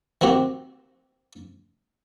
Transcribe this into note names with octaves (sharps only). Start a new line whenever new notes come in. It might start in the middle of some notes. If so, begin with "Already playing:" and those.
D#3 C4 F#4 G4